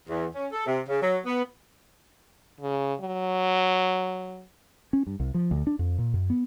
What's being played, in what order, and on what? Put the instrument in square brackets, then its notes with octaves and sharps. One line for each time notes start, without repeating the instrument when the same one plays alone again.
[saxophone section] E2
C#4
A4
C3
C#3
F#3
B3
[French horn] C#3
F#3
[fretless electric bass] C#4
G2
C2
F3
D2
D4
F2
A#2
F#2
B3